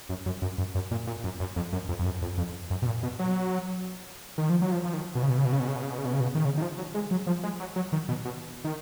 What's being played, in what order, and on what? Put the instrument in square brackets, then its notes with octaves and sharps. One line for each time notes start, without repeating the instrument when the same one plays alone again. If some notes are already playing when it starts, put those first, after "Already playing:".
[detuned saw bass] F#2
F#2
F#2
F#2
F#2
A#2
A#2
F#2
F#2
F2
F#2
F2
F2
F#2
F2
F2
F#2
B2
A#2
B2
F#3
D#3
F3
F#3
F3
F3
D#3
B2
C#3
B2
C#3
B2
C#3
B2
C#3
B2
C#3
B2
C#3
B2
C#3
B2
D#3
C#3
D#3
F3
F#3
G#3
F#3
F3
G#3
F#3
F#3
D#3
B2
B2
D#3